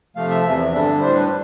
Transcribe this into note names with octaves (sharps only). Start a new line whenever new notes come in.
C3 F3 A3 F5
E5
E2 C3 E3
G2 D3 G3 D4
A2 G3 D4 C5
B4